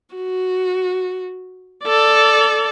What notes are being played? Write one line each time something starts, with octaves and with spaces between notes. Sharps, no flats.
F#4
A4 D5